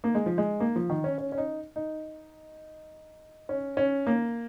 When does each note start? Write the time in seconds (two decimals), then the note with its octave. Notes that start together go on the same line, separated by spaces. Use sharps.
0.04 A#3
0.15 G#3
0.26 F3
0.38 G#3
0.60 A#3
0.76 F3
0.90 D#3
1.04 C#4
1.18 C#4
1.32 C#4
1.38 D#4
1.76 D#4
3.49 C#4
3.77 C#4
4.07 A#3